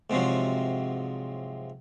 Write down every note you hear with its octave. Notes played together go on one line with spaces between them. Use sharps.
G#2 C3 F3 F#3